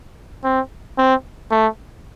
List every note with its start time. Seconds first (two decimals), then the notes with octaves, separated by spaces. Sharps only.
0.44 C4
0.98 C4
1.51 A3